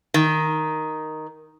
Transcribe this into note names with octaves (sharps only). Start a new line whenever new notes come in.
D#3